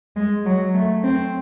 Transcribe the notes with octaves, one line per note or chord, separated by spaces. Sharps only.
G#3
F#3
A3
C4